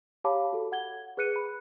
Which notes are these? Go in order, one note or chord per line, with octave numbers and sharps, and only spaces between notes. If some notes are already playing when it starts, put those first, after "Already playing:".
G4 C#5 F5 A5 B5 D6
F#4 A4
F#5 G#6 G7
G#4 B4 F#6 C#7 D#7
B5